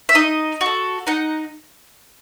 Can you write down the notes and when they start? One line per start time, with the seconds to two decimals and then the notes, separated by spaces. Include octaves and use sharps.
0.09 E5
0.15 D#4 D#5
0.61 F#4 A4
1.07 D#4 F#5